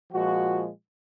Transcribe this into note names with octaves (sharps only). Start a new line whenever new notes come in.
A#2 F3 G#3 F#4